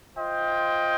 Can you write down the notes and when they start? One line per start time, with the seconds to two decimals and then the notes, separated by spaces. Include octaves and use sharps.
0.15 F4 C5 D#5 G5